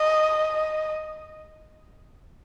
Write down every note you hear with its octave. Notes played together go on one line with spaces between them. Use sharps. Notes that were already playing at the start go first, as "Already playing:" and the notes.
Already playing: D#5